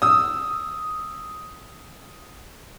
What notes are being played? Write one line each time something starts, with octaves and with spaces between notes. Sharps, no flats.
D#6 E6